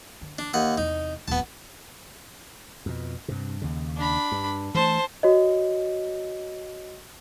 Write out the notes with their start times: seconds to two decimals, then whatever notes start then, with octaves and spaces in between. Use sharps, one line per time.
0.21 D3
0.39 D4
0.53 D#2 F#5 D#6
0.78 E2 C3 D#4
1.28 D1 B3 A5
2.86 F2 B2
3.28 G2 C3
3.62 D#2 C#3
3.97 D4 B5
4.32 G2
4.75 E3 F3 A3 C5 A5
5.23 F#4 C#5 D#5